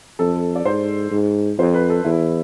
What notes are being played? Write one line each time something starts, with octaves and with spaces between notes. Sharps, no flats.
F2 A4
D5
G#2 C5
G#2
F2 C5
B4
A4
E2 E4